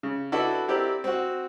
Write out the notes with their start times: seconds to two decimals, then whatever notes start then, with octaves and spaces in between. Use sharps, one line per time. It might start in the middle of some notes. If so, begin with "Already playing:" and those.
0.03 C#3
0.32 D4 E4 F#4 A4 B4 D5
0.68 C4 E4 G4 A#4 D5
1.04 C4 F#4